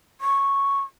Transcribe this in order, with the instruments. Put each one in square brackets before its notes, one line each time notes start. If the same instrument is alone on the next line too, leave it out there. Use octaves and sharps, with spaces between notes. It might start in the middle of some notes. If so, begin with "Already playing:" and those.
[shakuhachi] C#6